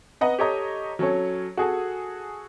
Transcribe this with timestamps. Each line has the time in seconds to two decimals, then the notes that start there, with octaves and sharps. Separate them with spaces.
0.21 B4 D#5 F#5 A#5
0.39 G4 A4 C#5 D#5 A#5 D#6
0.99 F#3 C#4 A4 C#5
1.57 F#4 G#4 A4 G#5